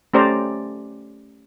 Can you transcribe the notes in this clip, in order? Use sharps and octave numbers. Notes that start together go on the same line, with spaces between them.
A3 C#4 G4 C5 D5 A#5